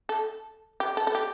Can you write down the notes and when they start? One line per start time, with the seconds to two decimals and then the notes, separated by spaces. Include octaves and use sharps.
0.09 A4
0.80 G4
0.97 A4
1.07 A4
1.15 G4